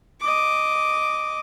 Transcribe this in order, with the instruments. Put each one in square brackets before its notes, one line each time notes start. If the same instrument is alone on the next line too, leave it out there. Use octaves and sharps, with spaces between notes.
[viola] D#5 D6